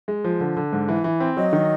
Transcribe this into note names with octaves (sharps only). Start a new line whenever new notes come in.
G#3
F3
D3
D3
G#2
E3
E3
C4
F#3 D#5
D#3